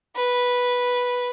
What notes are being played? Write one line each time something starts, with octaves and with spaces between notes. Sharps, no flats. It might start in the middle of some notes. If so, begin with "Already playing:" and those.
B4